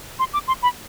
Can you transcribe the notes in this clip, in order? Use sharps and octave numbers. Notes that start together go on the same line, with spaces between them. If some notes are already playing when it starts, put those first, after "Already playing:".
C6
D6
C6
B5